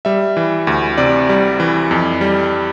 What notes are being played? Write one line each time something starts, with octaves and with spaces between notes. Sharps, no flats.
G3 E5
E3
D2
C3 D5
G3
E3
F2
G3